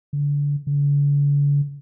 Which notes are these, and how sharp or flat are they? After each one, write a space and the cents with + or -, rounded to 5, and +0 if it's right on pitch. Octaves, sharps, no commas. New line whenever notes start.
D3 -30
D3 -45